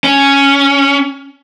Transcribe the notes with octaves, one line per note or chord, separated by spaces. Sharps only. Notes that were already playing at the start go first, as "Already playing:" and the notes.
C#4